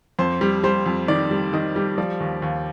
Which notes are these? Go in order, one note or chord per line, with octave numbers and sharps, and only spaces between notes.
F2 C5
G3
G3 C5
F2
D#3 D5
G3
D#3 D#5
G3
F3 D5
D#2
D#2